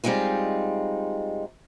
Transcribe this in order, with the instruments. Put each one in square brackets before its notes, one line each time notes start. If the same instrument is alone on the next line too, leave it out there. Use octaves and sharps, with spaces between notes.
[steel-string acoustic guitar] G3 G#3 C4 D#4 F4